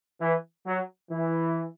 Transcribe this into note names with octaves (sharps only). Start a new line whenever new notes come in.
E3
F#3
E3